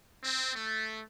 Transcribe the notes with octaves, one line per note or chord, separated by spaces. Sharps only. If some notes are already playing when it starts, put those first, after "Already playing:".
C4
A3